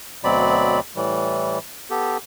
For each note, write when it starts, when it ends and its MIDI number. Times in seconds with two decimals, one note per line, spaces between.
0.24 0.80 38
0.24 0.80 47
0.24 0.80 54
0.24 0.80 60
0.24 0.80 74
0.24 0.80 83
0.96 1.59 45
0.96 1.59 52
0.96 1.59 55
1.90 2.17 59
1.90 2.17 67
1.90 2.17 69